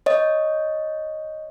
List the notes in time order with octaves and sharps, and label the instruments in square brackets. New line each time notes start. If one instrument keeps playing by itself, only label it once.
[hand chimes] C#5 D#5